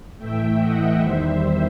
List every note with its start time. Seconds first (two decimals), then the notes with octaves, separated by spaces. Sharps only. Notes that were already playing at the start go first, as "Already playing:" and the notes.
0.18 A2 E3 A3 E5 G5
0.59 D#5 F#5
0.99 E2 D#3 G3 C5 E5